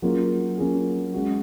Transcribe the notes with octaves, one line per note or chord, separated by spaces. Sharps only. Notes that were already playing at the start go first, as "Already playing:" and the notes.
F#3 A#3 C#4 F4 G#4
F#3 A#3 C#4 F4 G#4
G#3 C#4 F#4